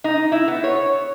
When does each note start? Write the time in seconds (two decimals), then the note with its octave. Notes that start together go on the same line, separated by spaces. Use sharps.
0.04 D#4
0.32 E4
0.48 B3
0.64 C#5